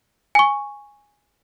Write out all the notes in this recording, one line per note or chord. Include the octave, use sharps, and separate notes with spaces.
G#5 C#6